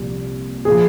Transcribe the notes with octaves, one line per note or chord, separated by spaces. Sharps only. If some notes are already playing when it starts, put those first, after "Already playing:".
Already playing: C2 A#2 F3
A#2 F3 G#4